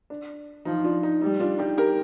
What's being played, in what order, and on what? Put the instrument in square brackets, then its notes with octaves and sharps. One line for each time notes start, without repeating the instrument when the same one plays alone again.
[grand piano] D4
[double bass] F3 [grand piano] D#4
[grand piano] D4 F4
D#4
[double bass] G3 [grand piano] D#4
[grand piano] D4 F4
D#4 G4
G4 A#4